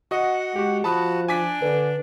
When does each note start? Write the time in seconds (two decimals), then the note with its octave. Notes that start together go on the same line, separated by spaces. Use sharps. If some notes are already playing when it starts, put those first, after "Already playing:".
0.11 F#4 D#5 F#5
0.56 G#3 F#4 G4
0.84 F3 F#4 A5 B5 D#6
1.28 D4 G#5 D6 B6
1.62 D3 B4